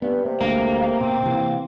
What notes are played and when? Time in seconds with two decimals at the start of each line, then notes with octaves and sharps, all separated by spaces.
0.02 G2 B3
0.25 C3 A#3
0.41 D2 G#3 A#3
1.00 B2 C4
1.23 C3 E3